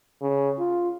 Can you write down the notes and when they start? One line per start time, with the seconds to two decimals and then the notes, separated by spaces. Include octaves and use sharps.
0.22 C#3
0.59 F4